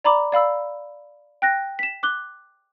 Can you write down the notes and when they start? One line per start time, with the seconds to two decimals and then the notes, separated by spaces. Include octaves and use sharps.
0.04 D5 A#5 B5 D6
0.32 D5 F5 B5 E6
1.42 G5 F#6 A#6
1.79 B6 E7
2.03 D6 F#6 G7